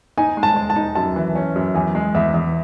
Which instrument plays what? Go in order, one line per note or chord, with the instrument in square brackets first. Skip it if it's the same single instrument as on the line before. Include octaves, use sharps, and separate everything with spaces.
[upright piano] D#4 [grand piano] G#5
[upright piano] G#3
[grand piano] A5
[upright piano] G#3
[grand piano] A5
[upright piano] D#4
[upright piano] F#2 [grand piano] A5
[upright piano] E3
C#4
F#2
[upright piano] E2 [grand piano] G#5
[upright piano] G#3
[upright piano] E2 [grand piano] E5
[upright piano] E2